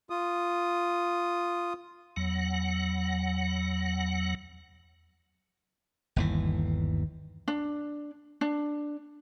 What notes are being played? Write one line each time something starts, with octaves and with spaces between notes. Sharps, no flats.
F4 D#6
E2 F#3 F#5
G1 D#2 E3
D4
D4